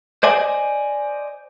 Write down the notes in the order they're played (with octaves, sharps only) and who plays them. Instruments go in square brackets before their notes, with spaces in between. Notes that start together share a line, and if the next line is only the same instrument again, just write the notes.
[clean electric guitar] C5 D5 D#5 G#5